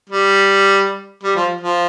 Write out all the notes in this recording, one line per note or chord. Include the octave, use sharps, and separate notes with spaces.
G3
G3
F3
F3